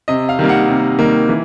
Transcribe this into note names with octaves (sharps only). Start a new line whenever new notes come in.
C3 D#5
F5
D#3 G3 A#3
F#5
C3
D#3 G3 A#3
E3